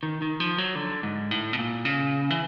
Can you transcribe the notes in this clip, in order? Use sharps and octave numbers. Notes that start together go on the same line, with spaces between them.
D#3
D#3
F3
F#3
D3
G#2
A2
B2
A#2
C#3
E3